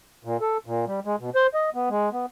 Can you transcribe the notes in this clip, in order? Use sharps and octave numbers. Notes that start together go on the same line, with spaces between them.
A#2
A4
A#2
G3
G#3
B2
C5
D#5
B3
G#3
B3